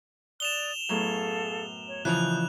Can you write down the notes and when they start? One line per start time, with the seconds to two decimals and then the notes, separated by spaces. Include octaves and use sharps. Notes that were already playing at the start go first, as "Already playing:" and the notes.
0.40 D5 D#6 F#6 E7 F7 G7
0.89 F#2 A2 B3 G#4 A4 F5
1.88 C#5
2.05 C#3 E3 F3 D#5 F#6 G6 F7